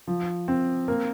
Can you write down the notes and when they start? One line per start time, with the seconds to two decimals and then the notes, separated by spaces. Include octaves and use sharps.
0.07 F3
0.48 C4
0.88 A#3